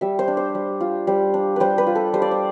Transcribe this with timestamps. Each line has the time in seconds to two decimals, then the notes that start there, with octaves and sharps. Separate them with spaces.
0.01 G3 E5
0.19 C5
0.28 D4
0.37 C5
0.55 G3
0.81 F4
1.07 G3 C5
1.34 D4
1.56 G3 B4 C5
1.78 B4
1.87 F4
1.95 A4
2.14 G3 C5
2.22 D5
2.31 C5